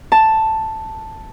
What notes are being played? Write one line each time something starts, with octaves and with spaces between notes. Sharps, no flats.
A5